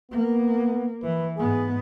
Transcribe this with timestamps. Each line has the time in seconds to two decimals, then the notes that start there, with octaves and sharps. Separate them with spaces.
0.12 A#3 B3
1.03 E3 B4
1.37 G#2 B3 G#4